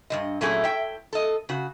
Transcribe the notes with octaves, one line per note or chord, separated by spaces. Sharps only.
G2 G3 D#5
A#2 F#3 A3 C#4 E4 G#4
E5 G5
A4 D#5
C#3 F#4